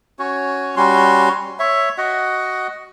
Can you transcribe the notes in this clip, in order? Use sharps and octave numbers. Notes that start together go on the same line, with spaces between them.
C#4 F#4 C#5
G3 C#4 F#4 C6
C#5 E5
F#4 D#5 F#5